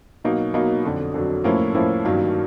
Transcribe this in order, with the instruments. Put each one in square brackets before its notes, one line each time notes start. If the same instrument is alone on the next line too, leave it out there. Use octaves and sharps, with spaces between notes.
[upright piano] B2 F#3 A#3 D#4
B2 F#3 A#3 D#4
F2 D3 F#3
F2 D3 F#3
A2 F3 A#3 C#4 E4
A2 F3 A#3 C#4 E4
G2 D#3 F#3 A#3 C#4